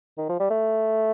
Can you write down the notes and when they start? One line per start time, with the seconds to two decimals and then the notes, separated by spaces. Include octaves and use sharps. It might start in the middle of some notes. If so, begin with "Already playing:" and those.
0.18 D#3
0.29 F3
0.40 G3
0.50 A3